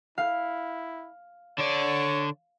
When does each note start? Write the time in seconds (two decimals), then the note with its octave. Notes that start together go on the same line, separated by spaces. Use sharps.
0.18 E4 F5
1.58 D3 C#5 D5